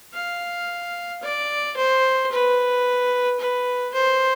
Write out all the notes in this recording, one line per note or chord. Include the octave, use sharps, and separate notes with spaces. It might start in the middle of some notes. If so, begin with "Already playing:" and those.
F5
D5
C5
B4
B4
C5